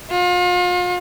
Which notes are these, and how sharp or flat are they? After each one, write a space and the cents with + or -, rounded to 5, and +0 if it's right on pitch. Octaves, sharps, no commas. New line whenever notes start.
F4 +40